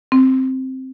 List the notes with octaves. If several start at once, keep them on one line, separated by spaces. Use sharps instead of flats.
C4